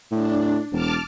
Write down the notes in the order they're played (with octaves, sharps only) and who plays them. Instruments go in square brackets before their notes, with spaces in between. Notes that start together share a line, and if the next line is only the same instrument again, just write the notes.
[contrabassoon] A2 [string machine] D4
[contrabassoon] E1 [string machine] A5 D6 F6